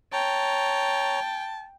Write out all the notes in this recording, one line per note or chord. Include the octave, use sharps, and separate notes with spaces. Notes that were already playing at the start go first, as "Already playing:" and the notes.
C#5 G5 A5 A#5